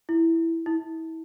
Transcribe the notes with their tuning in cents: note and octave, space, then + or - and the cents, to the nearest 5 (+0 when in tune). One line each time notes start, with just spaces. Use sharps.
E4 +5
E4 -30